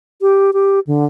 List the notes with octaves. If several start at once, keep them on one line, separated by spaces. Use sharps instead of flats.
G4
G4
D3